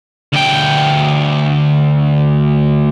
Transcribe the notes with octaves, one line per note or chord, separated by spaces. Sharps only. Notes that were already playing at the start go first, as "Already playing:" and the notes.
D2 G5